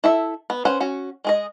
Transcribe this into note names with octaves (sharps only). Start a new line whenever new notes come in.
E4 A4 E5
B3
C#4 B4 C5 F#5
C#4 F#4
G#3 G#4 D#5